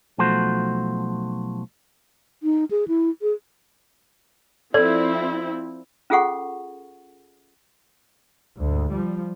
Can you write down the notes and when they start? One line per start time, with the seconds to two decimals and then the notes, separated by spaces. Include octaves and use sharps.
0.18 B1 F3 A3 F#4 C5
2.43 D#4
2.71 G#4
2.88 E4
3.22 G#4
4.74 F3 C4 E4 A4 D5
6.10 C#4 F4 G#4 A4 F#5 C#6
8.59 D2 G#2
8.92 F3 G3